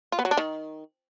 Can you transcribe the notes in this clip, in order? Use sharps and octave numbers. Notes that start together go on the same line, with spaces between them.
F4
B3
F#3
D4
D#3